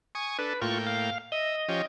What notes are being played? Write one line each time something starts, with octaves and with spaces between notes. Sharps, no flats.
G#5 C#6 D#6
D4 A4 B4
A2 A#3 F4 G5 C#6
F5
D#5 E5
F3 C#4 G4